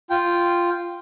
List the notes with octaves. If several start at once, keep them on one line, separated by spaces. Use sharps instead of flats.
F4 G5